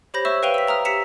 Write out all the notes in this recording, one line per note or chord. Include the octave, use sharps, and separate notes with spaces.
G4 C5 C#5 B5 G6 A#6
C#5 E5 C#6 E6 E7
B4 F5 G5 D#7 F7 G7
E6 B6
E5 A#5 D#6 F6
G4 A#5 E6 B6 C#7 E7